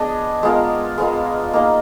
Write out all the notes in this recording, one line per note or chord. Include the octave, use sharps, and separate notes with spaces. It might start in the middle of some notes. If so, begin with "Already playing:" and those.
Already playing: B3 D4 G#4 D#5
G#3 B3 F4 A#4
G#3 B3 F4 A#4
A#3 D#4 G#4 D#5